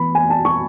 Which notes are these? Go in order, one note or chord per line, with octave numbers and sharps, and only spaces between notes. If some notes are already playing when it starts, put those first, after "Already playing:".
Already playing: E3 B3 B5
G#5
A5
C#6